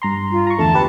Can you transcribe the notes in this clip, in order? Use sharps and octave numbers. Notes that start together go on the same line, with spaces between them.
G2 A#5 C6
F4
A#5 C#6
E2 D3 A3 A5
G4 B4